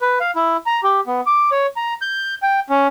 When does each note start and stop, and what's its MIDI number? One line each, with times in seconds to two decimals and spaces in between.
0.01 0.19 71
0.20 0.31 77
0.36 0.57 64
0.66 0.81 82
0.83 1.00 67
1.07 1.21 59
1.26 1.50 86
1.52 1.67 73
1.76 1.94 82
2.02 2.35 91
2.43 2.60 79
2.70 2.87 61